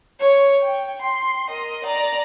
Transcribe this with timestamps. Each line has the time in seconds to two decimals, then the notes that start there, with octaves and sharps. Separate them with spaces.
0.19 C#5
0.62 G5
1.02 C6
1.49 A#4 D#5
1.84 D5 A#5